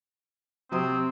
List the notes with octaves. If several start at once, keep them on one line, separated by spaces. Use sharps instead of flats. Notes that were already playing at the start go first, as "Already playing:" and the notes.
C3 F#3 C4 D#6